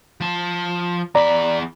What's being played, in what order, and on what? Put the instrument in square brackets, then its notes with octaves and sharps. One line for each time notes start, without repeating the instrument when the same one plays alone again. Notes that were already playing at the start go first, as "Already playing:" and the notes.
[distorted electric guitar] F3 A5
[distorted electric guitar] E2 B5 [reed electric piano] D5 A#5